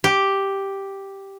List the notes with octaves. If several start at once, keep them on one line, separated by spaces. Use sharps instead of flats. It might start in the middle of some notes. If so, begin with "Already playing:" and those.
G4